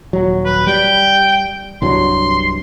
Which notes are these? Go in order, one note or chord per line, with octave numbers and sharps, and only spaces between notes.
D#1 F#3
B4
G3 G5
C2 G2 F#3 C6